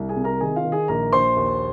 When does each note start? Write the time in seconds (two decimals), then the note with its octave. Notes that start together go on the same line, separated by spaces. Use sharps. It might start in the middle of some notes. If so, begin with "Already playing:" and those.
Already playing: C2
0.09 G#4 G#5
0.16 C3
0.24 A#4 A#5
0.41 D#3 G#4 G#5
0.56 F4 F5
0.65 D#3
0.72 G#4 G#5
0.88 A#1 A#4 A#5
1.13 A#1 C5 C6
1.36 D#2